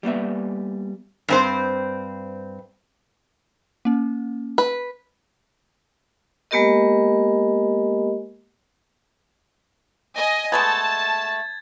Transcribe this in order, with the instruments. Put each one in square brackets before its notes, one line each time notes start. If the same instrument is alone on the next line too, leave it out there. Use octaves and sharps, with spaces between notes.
[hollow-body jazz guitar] G3 A#3 B3 E5
[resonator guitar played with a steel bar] G2 C4 C5
[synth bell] A#3 C#4
[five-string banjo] B4
[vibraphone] G#3 A#3 B3 G4 A#4 D#5
[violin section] D#5 G#5
[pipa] G#3 A3 B3 [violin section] A5 [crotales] G#6 A6